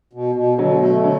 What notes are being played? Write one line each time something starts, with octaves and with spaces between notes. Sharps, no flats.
B2
B2
B2 D3 F#3
A3
D3 F#3 A3